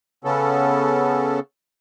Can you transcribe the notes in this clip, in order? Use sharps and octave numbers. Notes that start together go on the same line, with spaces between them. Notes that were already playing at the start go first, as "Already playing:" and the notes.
C#3 B3 C#4 A4